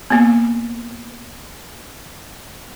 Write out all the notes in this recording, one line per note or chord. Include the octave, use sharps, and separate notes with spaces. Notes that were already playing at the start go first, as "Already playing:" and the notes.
A#3 B3